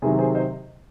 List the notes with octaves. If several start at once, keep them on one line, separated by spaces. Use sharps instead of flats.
C3 D#3 F#3 E4 G#4
G#4 C5
C5 D#5